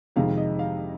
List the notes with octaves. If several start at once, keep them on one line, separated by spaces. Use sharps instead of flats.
F2 C3 D#3 G#3 F5
D#5
F5